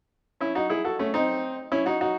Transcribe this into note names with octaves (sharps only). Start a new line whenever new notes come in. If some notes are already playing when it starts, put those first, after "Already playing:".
C#4 E4
D#4 F#4
E4 G#4
F#4 A4
A3 C#4
C4 D#4
C#4 E4
D#4 F#4
D#4 F#4